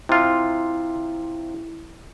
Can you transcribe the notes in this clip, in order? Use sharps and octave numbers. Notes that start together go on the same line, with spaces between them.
C3 E4 F4